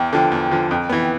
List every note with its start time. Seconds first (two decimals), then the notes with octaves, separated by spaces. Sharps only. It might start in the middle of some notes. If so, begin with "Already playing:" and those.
Already playing: E2 G5
0.13 D3 F3
0.32 E2
0.51 D3 F3
0.70 F2 G5
0.89 E3 B3